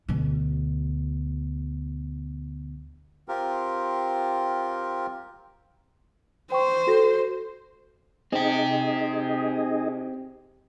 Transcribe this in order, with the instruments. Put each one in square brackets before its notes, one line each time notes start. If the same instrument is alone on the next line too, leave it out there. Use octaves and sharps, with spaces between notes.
[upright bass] D2 B2
[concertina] C4 F4 G4 A#4
[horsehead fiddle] C5 [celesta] G5 C#6
[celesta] F#4 A4 A#6
[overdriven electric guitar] C4 G4 [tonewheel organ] D#4 G#4 D#5